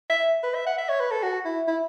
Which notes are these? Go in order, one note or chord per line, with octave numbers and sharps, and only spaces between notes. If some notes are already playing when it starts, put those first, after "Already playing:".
E5
B4
E5
F#5
E5
C#5
B4
A4
F#4
E4
E4